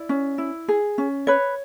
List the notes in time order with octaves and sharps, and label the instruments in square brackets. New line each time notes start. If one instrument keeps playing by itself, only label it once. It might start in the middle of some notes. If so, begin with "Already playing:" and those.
Already playing: [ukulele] E4 D5
C#4
E4
G#4
C#4
B4 C#5